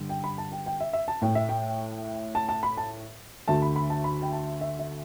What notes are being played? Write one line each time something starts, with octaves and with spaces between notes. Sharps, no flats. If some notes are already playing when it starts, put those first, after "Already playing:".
Already playing: G2 D3 G3
G5
B5
A5
G5
G5
E5
E5
A5
A2 A3 G5
E5
G5
A5
A5
B5
A5
D2 D3 A3 A5
B5
B5
A5
B5
G5
A5
E5
E5